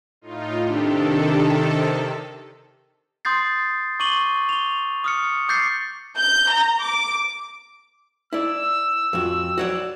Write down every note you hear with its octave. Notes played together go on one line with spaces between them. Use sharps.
A2 D#4 F4
C3 D#3 D4 G4 A4
C6 D#6 G6 A6 C7
C#6 D6 D#7 F#7 G7
F7 G7
D#6 F6 C#7
D6 G6 A6 C7 C#7
G6
A#5
D6
E4 D5 E6
F2 F#4
F#4 C#5 D5